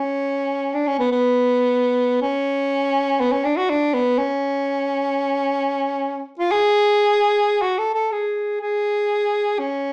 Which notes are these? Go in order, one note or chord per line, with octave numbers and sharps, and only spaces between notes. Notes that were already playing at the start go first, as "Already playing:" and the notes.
Already playing: C#4
D4
C#4
B3
B3
C#4
B3
C#4
D4
F#4
D4
B3
C#4
F4
G#4
F#4
A4
A4
G#4
G#4
C#4